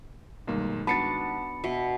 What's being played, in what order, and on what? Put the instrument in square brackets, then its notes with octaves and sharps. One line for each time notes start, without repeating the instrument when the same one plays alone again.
[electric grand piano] B1 A#3 [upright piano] G2 D#3 G#3
[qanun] B3 D4 F#4 [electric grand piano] A5 A6 [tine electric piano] B5 C#7
[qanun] B2 [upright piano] E5